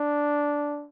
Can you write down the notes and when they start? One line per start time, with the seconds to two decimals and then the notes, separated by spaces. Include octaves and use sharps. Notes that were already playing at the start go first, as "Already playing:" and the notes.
Already playing: D4